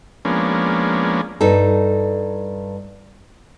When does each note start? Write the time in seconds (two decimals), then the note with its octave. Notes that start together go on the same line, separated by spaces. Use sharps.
0.25 F3 G#3 A#3 B3 C#4 D4
1.41 G2 D#4 A4